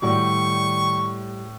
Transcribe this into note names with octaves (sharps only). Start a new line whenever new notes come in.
A2 D#3 G3 F#4 D5 C#6